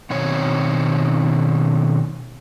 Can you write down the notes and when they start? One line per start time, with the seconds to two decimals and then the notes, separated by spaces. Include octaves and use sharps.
0.10 B2 D#3 C4 C#5